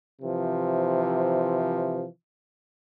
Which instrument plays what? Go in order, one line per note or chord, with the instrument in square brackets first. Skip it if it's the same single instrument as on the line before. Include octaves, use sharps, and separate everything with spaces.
[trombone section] C3 E3 F3